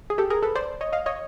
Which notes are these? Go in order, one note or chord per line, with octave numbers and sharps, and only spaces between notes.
G#4
G4 A4
G#4 A#4
A4 B4
C5 D5
C#5 D#5
D#5 F5
C#5 D#5